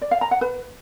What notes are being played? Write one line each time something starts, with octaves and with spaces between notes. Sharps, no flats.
D5
F5
A#5
F#5
B4